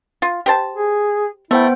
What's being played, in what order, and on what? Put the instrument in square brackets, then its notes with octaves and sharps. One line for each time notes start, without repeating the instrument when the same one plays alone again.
[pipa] F4
G4 C5 A5
[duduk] G#4
[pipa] A3 [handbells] B3 C5 G5 [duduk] E4